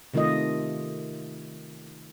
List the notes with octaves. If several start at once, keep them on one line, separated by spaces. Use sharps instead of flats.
C3 D#3 A3 F4 D#5